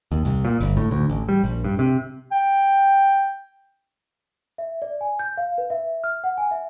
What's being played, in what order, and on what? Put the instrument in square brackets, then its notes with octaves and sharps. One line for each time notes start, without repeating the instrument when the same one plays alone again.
[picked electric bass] D#2
C2
A#2
G1
A2
D2
A1
G3
A#1
G2
C3
[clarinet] G5
[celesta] E5
D5
G#5
G6
F5
B4
E5
F6
F#5
G#5
E5